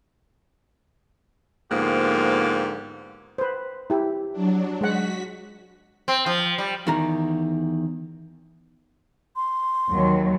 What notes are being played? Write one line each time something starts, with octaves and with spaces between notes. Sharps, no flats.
G#2 D3 F3 A#3 B3 G4
B4 C5
E4 G4
F#3 D4
G#3 F#4 F#5 B6
C4
F3
G3
E2 D#3 A#5
C6
D#2 F#3